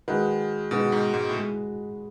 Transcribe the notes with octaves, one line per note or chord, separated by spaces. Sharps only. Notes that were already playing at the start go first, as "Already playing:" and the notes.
D#3 G#3 D#4 F#4 B4
B2 G#3 D#4 F#4 B4
G#2
G#2
A2
G#3